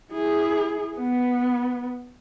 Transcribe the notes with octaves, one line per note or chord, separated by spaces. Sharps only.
E4 G#4
B3 B4